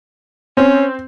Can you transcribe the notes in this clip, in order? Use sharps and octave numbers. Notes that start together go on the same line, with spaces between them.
C4 C#4